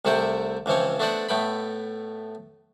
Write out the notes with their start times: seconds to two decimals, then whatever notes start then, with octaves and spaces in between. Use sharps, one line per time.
0.05 C2 C3 A3 C5 F#5 G5
0.66 C#2 E3 F3 C4 C#5
1.00 A3 B3 D4 C5 D5 F#5
1.29 A2 A3 B3 G5 B5